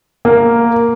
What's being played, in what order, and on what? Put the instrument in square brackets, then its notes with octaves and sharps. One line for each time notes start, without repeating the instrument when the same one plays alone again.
[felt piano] A#3